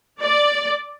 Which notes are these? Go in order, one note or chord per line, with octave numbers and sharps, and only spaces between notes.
D5